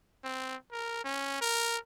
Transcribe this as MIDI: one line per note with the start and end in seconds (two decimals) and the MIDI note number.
0.24 0.56 60
0.72 1.00 70
1.04 1.40 61
1.42 1.77 70